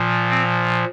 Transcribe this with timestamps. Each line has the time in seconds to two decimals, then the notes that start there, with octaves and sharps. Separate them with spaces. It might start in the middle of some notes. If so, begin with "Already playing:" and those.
Already playing: A#2 F3
0.30 C4